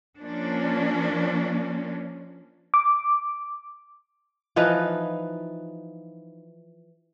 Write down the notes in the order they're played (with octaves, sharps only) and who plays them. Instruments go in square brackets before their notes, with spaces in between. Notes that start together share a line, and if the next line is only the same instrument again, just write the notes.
[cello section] F3 A#3 C#4 D4
[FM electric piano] D6
[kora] E3 F3 D#4 B4